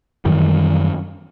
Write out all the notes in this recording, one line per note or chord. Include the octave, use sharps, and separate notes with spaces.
F#2 D#3 E3 G3